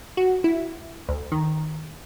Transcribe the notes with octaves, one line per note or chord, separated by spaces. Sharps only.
F#4
E4
D2
D#3